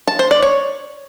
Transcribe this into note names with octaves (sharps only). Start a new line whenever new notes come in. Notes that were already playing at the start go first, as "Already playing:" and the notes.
A5
C5
D5
C#5